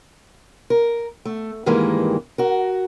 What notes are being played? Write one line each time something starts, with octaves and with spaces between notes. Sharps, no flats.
A#4
A3
G2 D#3 E3 G3 G#3 A#3
F#4 A#4